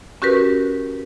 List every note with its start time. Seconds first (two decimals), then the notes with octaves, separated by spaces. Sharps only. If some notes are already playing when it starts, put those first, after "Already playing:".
0.22 C#4 F#4 G4 A#4 B4